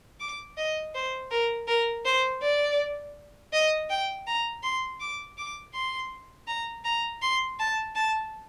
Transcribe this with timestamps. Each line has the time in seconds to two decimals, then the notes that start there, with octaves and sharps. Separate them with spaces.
0.20 D6
0.57 D#5
0.95 C5
1.31 A#4
1.68 A#4
2.05 C5
2.42 D5
3.53 D#5
3.90 G5
4.27 A#5
4.63 C6
5.00 D6
5.38 D6
5.74 C6
6.47 A#5
6.84 A#5
7.22 C6
7.59 A5
7.95 A5